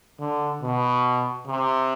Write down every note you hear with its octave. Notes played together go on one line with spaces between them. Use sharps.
D3
B2
C3